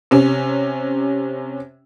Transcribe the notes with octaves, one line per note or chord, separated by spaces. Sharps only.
C3 C#4